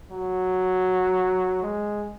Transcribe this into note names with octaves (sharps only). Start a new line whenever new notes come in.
F#3
G#3